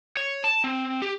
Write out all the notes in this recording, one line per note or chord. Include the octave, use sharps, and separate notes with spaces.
C#5
A5
C4
G4